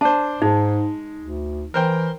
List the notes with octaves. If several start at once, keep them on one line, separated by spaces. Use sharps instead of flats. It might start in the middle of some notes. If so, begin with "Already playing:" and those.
D4 C5 A5
G#2 G#3 D#4
D2
E3 A#4 C5 G5